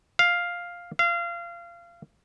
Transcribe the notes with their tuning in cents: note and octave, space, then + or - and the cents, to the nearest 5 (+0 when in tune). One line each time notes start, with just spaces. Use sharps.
F5 +5
F5 -25